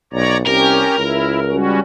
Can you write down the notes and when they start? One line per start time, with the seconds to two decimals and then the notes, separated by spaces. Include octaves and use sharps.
0.13 B1 C#5 D5 A#5
0.47 C2 C#4 G4 A#4
0.98 C#2 E4
1.51 G3 C#4 F#4